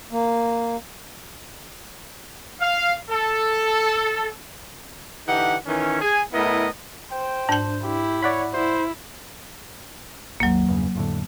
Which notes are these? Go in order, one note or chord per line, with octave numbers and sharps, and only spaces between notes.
A#3
F5
A4
D3 E3 D#4 G4 F#5
D#3 E3 C#4
G#4 G#5
A2 B3 E4 A#4 D#5
C5 G5
G#2 D4 A5 G6
E4 G4
C#5 D5 F#5 B5
E4 C5
G#1 D#2 F#3 A#3
E2 G2 C#3
F2 A2 D3